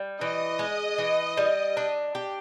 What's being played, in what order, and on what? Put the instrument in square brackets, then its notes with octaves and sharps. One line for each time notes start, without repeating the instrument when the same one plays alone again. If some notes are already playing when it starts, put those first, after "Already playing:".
Already playing: [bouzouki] G3
[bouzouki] E3 [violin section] D#5
[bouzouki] G#3
E3
G3
D4
G4